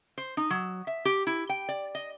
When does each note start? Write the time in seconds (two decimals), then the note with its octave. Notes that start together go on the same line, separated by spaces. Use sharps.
0.18 C5
0.37 D#4
0.50 F#3
0.87 E5
1.05 G4
1.27 E4
1.49 G5
1.69 D5
1.95 D#5